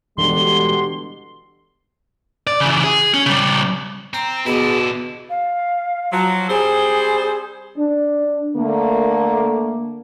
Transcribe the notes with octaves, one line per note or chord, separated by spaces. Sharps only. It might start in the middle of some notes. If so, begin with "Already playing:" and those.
B2 D3 E3 G3 G#3 C6 G7
D5
C#3 E3
G#4
C#4
C#3 G3
C4 A#5
B2 D3 E4 G#4
F5
F3 F#3
G3 C4 G#4 C5
D4
D3 A3 A#3